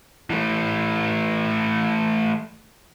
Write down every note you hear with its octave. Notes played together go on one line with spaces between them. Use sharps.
E3 A3